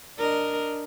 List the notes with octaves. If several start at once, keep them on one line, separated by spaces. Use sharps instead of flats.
D4 A#4 D#5